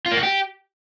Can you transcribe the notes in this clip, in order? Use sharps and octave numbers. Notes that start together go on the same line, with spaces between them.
F4
A#3
F#4
G4